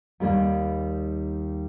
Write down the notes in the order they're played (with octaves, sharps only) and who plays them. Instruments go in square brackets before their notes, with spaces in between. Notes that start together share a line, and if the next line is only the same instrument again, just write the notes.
[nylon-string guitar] D#2 D#3 G3 A#3